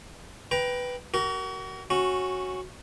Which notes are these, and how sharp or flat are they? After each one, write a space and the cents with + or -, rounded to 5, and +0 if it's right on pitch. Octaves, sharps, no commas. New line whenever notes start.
B4 +5 G5 +0 A#5 +20
F#4 +35 A#4 +0
C#4 -15 F#4 +0